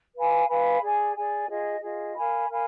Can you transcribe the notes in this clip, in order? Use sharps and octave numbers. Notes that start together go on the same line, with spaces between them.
B4 F5 G#5 B5
B4 F5 G#5 B5
G#4 D5 G#5
G#4 D5 G#5
F4 G#4 D#5
F4 G#4 D#5
A#4 F5 G#5 B5
A#4 F5 G#5 B5